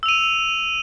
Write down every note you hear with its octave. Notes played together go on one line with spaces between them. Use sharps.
E6 D#7 F7